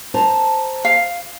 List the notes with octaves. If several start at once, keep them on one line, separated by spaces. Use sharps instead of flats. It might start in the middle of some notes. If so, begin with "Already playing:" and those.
C5 A5 A#5
F5